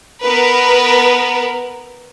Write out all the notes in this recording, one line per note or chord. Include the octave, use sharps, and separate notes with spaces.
B3 A#4 B4